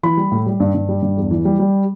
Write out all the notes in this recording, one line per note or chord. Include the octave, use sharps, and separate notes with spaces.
E3 B5
G3
A2
G3
G2
G2
G3
G2
E2
E3
G3
G3